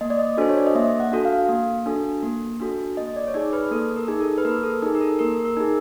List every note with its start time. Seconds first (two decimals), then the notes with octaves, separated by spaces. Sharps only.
0.01 A#3 D#5
0.10 D5
0.19 D#5
0.37 D4 F#4 A4 C5
0.49 C#5
0.58 D5
0.67 D#5
0.75 A#3 E5
1.00 F#5
1.11 D4 F#4 A4
1.25 F5
1.49 A#3
1.86 D4 F#4 A4
2.23 A#3
2.60 D4 F#4 A4
2.97 A#3 D#5
3.16 D5
3.27 C#5
3.34 D#4 G#4 D5
3.53 B4
3.71 A#3 A4
3.96 A#4
4.08 D#4 G#4
4.21 A4
4.38 B4
4.45 A#3 A#4
4.63 A4
4.82 D#4 A#4
4.86 G#4
4.95 A#4
5.01 A4
5.19 A#3 A#4
5.45 A#4
5.57 D#4 G#4